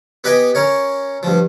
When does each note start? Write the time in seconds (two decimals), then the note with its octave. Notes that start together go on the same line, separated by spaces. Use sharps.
0.24 B3 G4 B4 D#5 G5 G#5
0.55 C#4 A#4 C#5
1.23 G2 F3